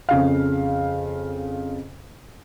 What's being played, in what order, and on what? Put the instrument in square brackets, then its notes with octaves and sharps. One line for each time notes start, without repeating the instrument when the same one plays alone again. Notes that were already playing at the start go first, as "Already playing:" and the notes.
[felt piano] F2 C#3 F5